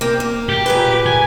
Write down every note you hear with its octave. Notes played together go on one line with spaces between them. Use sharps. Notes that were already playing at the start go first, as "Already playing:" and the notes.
A#3 C4
A#3
G4
A#2 G#4 B4
G#5